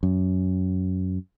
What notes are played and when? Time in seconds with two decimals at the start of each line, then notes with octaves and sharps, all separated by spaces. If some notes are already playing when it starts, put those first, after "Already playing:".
0.03 F#2